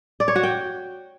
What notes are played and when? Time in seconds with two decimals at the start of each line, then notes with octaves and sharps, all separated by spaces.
0.20 D5
0.28 C#5
0.36 F#4
0.43 G5